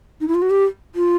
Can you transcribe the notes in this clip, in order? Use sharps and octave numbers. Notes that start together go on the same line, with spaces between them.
D#4
E4
F4
F#4
G4
F4